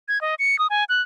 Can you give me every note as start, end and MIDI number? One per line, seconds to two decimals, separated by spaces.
0.08 0.21 92
0.21 0.35 75
0.39 0.59 97
0.59 0.67 87
0.70 0.84 80
0.89 1.02 90